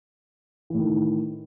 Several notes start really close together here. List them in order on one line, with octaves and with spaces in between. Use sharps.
E3 A2 D#3